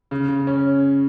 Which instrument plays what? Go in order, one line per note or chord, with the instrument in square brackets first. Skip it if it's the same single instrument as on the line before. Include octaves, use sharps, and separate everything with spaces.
[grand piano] C#3
C#3
C#4